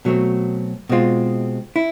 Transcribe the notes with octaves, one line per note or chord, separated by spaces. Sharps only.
B2 F#3 A3 C4
B2 G#3 C4 F4
E4